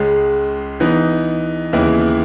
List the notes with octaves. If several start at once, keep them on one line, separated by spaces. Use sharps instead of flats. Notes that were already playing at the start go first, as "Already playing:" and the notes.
Already playing: C#2 C#3 G#3
E3 B3 D#4
D#2 C#3 E3 B3 E4